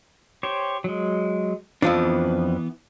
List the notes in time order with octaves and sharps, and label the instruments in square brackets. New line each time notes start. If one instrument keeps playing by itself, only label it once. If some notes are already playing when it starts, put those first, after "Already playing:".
[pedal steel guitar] G4 C5 C#5
F#3 G#3
[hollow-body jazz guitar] F2 F3 D4 [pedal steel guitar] E3 B3